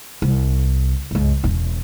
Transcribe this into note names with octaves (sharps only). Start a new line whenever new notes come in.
C2
C#2 G2
E1 C#4